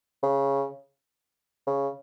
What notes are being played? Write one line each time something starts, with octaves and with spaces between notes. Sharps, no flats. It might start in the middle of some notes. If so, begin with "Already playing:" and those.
C#3
C#3